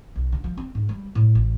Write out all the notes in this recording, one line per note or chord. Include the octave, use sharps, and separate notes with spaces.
B1
D3
F3
C4
G#2
G3
A2
A1